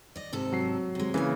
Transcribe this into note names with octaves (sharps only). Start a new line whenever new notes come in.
D5 D#5
G#2 C3 A4
F#3 C7
C3 G#3
A#2 C#3 E3 A#3 D5 G#5